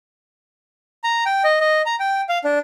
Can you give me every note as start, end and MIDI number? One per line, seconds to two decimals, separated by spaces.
1.04 1.24 82
1.26 1.43 79
1.44 1.60 75
1.60 1.82 75
1.86 1.95 82
2.00 2.21 79
2.29 2.38 77
2.44 2.59 62